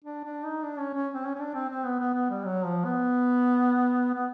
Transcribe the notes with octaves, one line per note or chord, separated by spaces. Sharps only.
D4
D4
D#4
D4
C#4
C#4
C4
C#4
C#4
D4
C4
C4
B3
B3
B3
G3
F#3
F3
B3
B3